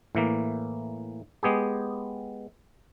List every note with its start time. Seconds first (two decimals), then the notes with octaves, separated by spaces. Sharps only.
0.15 A2 E3 A#3
1.43 G#3 B3 G4 G#4